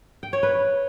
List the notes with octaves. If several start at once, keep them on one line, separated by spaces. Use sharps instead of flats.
G5
C#5
B4